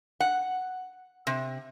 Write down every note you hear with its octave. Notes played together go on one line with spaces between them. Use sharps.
F#5
C3